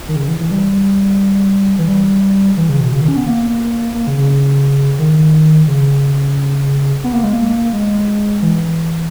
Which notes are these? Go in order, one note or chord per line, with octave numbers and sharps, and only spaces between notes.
D#3
C#3
E3
E3
G3
E3
G3
E3
C#3
B2
C#3
D#3
C#4
B3
A#3
A#3
C#3
C#3
D#3
C#3
B3
A#3
G#3
A#3
G#3
E3